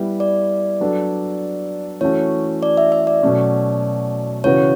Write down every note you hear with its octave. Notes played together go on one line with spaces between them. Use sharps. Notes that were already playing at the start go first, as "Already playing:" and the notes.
Already playing: G3 B3 E4 G4
D5
F#3 B3 D4 A4
E3 A3 C#4 F#4 A4 C#5
D5
E5
E5
D5
B2 F#3 A3 C#4
C#3 E3 B3 F#4 C#5